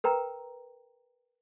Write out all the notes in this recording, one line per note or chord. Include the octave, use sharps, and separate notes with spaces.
A#4 B4 G5 A#5